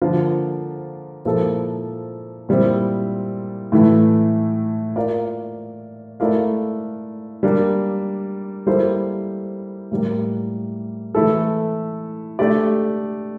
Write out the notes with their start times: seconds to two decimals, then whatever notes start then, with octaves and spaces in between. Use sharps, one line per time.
0.02 D3 F3 A#3 F4 A#4
1.25 A#2 F3 A#3 E4 A4
2.49 A#2 G3 C4 E4
3.72 A2 E3 A3 E4
4.96 A#3 F4 A#4 D5 F5
6.20 A3 E4 A#4 D5 F5
7.43 G3 A#3 D4
8.67 G3 A#3 E4 A4 C5
9.91 A2 G3 A#3
11.15 E3 A3 E4 A4
12.39 A3 D4 G4 D5